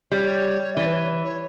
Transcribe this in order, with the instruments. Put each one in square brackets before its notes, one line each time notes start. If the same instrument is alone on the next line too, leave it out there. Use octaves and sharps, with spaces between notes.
[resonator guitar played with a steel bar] G3 [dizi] C#5
[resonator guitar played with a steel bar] E3 [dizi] D5
[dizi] B4
C#5
C#5